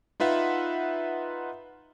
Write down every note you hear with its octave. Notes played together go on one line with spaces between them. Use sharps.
D#4 F4 B4 E5 F#5